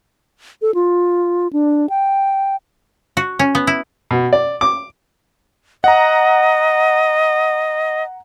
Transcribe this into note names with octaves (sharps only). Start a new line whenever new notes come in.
A4
F4
D4
G5
F#4
C#4
B3
E4
B2
D5
D6
D#5 F#5 A#5